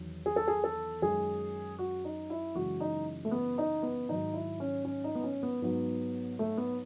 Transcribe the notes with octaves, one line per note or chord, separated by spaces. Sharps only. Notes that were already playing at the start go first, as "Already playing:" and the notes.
Already playing: E2 D#3 F#3
G#4
A4
G#4
A4
F#2 D#3 G#3 G#4
F#4
D#4
E4
F#2 C#3 E3 G#3 F#4
D#4
A3
B3
D#4
B3
G#2 D#3 F#3 D#4
E4
C#4
C#4
D#4
B3
C#4
B3
G#2 F#3 B3
A3
B3